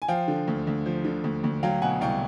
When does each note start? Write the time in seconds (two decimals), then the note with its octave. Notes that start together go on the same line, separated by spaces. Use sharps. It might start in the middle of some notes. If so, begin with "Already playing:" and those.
0.02 G#5
0.08 F3 F5 G5
0.28 D3
0.47 D2
0.67 D2
0.86 F3
1.05 D3
1.24 D2
1.44 D2
1.63 F#3 F5 G5
1.82 B2 F#5 G#5
2.01 C2 F5 G5